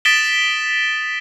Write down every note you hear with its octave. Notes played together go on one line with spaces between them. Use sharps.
D#6 A6 B6 D7 E7 G7